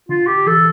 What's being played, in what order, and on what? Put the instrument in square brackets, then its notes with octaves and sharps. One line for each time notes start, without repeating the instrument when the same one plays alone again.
[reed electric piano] D3 [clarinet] F4
[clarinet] G4
[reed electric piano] E3 [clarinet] A4